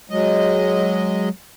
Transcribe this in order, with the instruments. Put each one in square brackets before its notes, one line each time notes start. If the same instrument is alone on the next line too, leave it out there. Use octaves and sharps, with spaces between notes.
[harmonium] F#3 G#3 D#5